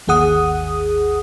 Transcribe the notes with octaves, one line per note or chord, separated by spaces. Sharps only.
G#1 D#2 G#4 F#5 D#6